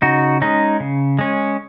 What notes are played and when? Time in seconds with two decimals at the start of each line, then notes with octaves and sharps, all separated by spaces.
0.02 C#3 D#4 F#4
0.42 G#3 C#4 D#4
0.80 C#3
1.19 G#3 C#4